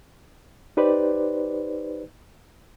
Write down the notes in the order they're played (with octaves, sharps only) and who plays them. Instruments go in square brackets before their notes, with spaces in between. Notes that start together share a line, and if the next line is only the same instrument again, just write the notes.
[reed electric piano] D#4 G4 B4 C5 D5